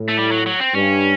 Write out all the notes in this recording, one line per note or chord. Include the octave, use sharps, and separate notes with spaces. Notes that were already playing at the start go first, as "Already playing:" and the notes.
Already playing: A2
A3
G3
F#3
F#3
C4
G2 C#4